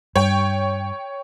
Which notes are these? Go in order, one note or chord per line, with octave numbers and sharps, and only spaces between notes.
G2 C#5 G5